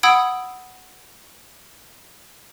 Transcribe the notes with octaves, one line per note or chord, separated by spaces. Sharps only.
F#5 B5 D#6 E6 G#6 D7